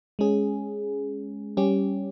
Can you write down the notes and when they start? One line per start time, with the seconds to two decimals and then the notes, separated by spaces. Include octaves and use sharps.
0.19 G#3 C#4 G#4
1.57 G3 C#4 G4